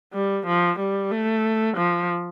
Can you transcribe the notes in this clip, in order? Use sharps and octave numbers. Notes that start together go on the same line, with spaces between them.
G3
F3
G3
A3
F3